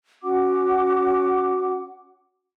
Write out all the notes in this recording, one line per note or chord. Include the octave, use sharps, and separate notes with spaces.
C#4 F#4 F#5 D6